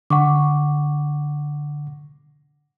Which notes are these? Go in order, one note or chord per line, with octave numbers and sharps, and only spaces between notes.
D3 F#5 C#6 D6